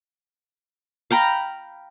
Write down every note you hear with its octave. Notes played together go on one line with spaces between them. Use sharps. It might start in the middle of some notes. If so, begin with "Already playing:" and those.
F5 G5 A#5 B5